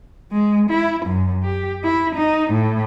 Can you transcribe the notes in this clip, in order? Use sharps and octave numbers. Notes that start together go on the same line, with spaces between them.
G#3
E4
F#2
G4
E4
D#4
A2